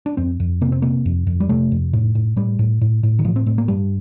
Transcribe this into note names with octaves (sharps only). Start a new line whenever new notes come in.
D4
F2 C4
F2
C3 A#3
C4
C3 A#3
F2
F2
G3
C3 A3
F2
A2
A2
A2 G3
A2
A2
A2
D#3
A2 F3
C4
A2 C4
A#3
G2 G3